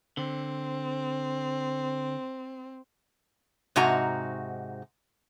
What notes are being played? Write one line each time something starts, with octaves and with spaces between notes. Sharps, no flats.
D3 C4
G#2 C3 D#4 F#4 A#5